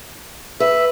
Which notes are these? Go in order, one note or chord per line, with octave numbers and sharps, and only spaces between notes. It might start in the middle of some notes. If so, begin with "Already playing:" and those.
B4 E5